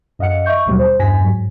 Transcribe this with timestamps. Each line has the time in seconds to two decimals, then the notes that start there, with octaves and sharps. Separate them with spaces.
0.19 F#2 D#5 F5 F#5 C#7
0.46 D#5 E5 C#6 G6
0.66 D#2 B2 D3 F#3 G3
0.79 C5
0.99 E2 G2 G#5 A#6 B6
1.21 G#2 F#3